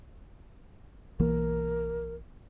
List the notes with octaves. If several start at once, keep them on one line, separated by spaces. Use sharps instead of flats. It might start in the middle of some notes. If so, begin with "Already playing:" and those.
B1 E3 A#3 A#4